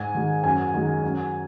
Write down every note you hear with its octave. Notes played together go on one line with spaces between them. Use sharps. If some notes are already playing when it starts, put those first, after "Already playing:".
Already playing: G#2 G#5
D#3 G#3
F#2 G#5
D#3 G#3
F#2